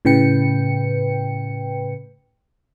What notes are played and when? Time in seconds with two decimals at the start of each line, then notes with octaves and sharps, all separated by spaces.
0.05 A2 C#3 B4 G5 C#7